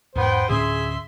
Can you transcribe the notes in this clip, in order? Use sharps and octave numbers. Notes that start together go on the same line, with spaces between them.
E2 G#2 B3 C5 G5
D2 A2 C#4 G#4 E5 C6